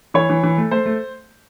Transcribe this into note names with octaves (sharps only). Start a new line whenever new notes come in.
E3 C#5
E3
E3
A3
A3 C5
A3